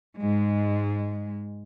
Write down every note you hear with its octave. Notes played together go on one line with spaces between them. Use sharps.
G#2 G#3